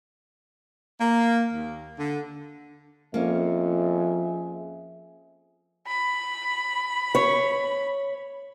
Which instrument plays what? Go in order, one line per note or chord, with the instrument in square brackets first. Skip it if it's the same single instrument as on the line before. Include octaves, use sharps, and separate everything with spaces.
[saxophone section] A#3
D#2
D3
[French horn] F2 [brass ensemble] F3 G#4 E5 [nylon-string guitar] A#3 C#4
[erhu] B5
[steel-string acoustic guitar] C#5